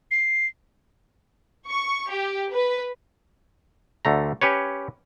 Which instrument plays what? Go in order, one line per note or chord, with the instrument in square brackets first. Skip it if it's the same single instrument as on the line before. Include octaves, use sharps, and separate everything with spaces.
[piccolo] C7
[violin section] C#6
G4
B4
[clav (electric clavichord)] D2 D3 A3 A#5
C#4 G4 B4 C#5